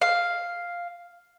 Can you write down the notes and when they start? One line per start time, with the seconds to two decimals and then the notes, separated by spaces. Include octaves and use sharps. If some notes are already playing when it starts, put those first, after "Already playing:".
0.02 F5